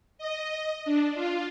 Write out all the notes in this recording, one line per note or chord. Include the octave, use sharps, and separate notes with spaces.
D#5
D4
F4